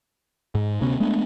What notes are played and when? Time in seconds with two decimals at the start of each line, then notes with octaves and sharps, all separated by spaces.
0.55 G#2
0.81 D2 C3 B3 C#4
1.00 G#3 A3 B3 D4